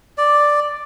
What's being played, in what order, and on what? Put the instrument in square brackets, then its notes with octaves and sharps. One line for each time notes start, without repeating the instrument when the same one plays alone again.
[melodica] D5